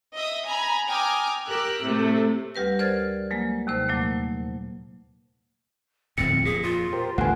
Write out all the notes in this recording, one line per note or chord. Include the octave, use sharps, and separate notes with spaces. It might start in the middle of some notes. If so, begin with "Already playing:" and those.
D#5 E5 D#6
G#5 A#5 B5
G5 G#5 A#5 D6 D#6 F6
G4 A#4 E6 F#6
A2 C3 A3
D2 G3 G4 B4 A#6
A#4 C5 D5 F6 G#6 A6
F#3 G#3 A#3
D#2 C3 C5
A#2 F#3 A3 A#3
D1 F2 G#2 C4 C#7
A#2 G#4
F4
G4 A#4 C5
A1 D#2 D3 A3 B3 F#5 G#5